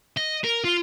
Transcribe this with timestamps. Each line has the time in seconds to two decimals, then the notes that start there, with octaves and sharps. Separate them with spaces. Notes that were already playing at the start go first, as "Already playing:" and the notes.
0.17 D#5
0.44 A#4
0.65 F4